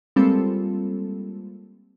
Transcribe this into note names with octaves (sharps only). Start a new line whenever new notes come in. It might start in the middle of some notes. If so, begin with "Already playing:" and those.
G3 G#3 A#3 C4 F4 A4